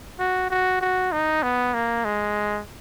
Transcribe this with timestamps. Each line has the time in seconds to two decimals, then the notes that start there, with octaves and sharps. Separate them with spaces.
0.19 F#4
0.50 F#4
0.81 F#4
1.12 D#4
1.43 B3
1.74 A#3
2.05 G#3